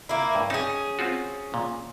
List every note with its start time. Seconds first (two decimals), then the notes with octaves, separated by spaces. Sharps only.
0.09 A#3 E4
0.35 G2
0.50 C#4 D#4 G#4 A5
0.99 C4 F4 F#4
1.54 A#2